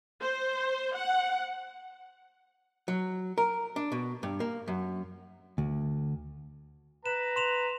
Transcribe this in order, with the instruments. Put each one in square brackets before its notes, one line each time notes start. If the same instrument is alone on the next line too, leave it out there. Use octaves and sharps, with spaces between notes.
[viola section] C5
F#5
[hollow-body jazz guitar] F#3
A#4
D4
B2
G2
A#3
F#2
D2
[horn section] B4 A#5 [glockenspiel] E7
[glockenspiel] C6 E7 F7